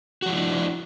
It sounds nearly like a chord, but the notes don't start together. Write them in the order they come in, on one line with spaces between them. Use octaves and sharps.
F#4 F3 E4 D4